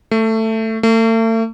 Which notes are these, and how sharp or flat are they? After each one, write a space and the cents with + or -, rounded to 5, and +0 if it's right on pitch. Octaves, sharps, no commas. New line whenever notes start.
A3 +15
A3 +40